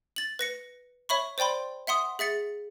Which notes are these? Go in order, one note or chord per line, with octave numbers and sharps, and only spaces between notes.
A6 F#7
B4 A#6 C#7
C#5 E5 B5 C#6
C5 D5 G5 B5 C6
E5 F#5 C6 D#6
G#4 E5 A6 C#7